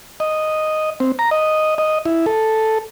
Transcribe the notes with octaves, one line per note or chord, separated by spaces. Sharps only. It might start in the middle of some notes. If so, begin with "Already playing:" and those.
D#5
C4
A#5
D#5
D#5
E4
A4